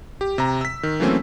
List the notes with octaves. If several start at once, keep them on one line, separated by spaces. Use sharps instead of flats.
G4
C3 A#5
E6 B6
D#3
E3 F#3 A3 A#3 C4 C#4